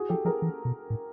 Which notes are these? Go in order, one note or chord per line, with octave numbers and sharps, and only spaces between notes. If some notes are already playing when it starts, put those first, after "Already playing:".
Already playing: F#4 G#4
F3 G4 A4
F3 G#4 A#4
E3
B2
A2